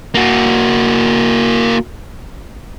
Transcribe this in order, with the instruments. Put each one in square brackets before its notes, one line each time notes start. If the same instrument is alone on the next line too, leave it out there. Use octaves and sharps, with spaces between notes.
[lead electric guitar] A#3 F#4